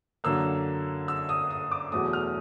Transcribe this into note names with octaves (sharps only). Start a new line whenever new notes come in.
F#2 D3 F#3 A#3 E6
E6
D#6
D#6
D6
E2 B2 F#3 A3 D#6
F6